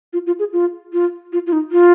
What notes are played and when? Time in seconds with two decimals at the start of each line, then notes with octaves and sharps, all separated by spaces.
0.13 F4
0.27 F4
0.39 G#4
0.53 F4
0.93 F4
1.33 F4
1.47 F4
1.52 D#4
1.72 F4